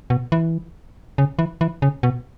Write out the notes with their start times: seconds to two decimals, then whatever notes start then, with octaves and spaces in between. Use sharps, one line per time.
0.10 B2
0.32 E3
1.18 C#3
1.39 E3
1.61 E3
1.82 C#3
2.03 B2